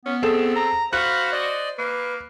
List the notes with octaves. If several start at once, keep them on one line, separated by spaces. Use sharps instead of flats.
B3 C#4
C4 G#4 A4 E7
A#5
F#4 C5 F5 B5 F#6
D5 D#5
A#3 B4